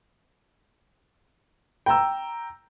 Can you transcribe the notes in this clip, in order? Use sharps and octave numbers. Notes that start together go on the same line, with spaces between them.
G5 A#5 E6